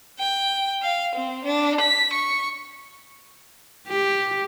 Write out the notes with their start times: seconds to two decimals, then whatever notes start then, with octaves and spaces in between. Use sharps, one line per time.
0.19 G5
0.83 F5
1.15 C4
1.45 D4
1.81 B6
2.13 C#6
3.88 G4